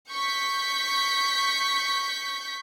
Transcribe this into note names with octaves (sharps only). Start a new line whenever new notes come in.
C#6 G6 B6